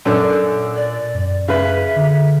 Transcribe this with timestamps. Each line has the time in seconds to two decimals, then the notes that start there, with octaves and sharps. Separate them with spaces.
0.05 F#2 A#2 C#4 D4 A4
0.76 D5
1.14 F#2
1.48 C#3 B4 E5
1.96 D3